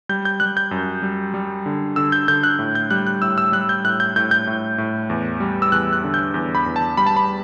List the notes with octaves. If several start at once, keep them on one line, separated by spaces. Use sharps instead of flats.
G3 G6
G6
G3 F#6
G6
F#2
G3
G3
D3
D3 E6
G6
D3 G6
F#6
A2
G6
G3 F#6
F#6
A2 E6
E6
G3 F#6
G6
A2 F#6
G6
A2 G6
G6
A2
A2
E2
G3
E6
E2 F#6
F#6
D3
G6
E2
B5
E2
A5
G3 B5
A5
B5